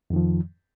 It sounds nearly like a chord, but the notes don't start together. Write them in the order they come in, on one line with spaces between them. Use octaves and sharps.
F2 D#3 F3